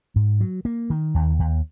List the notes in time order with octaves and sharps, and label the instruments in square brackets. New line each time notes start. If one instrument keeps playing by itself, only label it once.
[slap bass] G#2
F#3
A#3
D#3
D#2
D#2